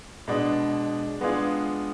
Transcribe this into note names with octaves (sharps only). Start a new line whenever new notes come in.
B2 G#3 B3 D4
G#3 B3 D4 F4 G#4